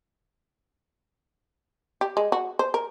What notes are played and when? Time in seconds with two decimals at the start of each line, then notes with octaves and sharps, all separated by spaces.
2.01 G4
2.17 G#3
2.32 F#4
2.59 C5
2.74 A#4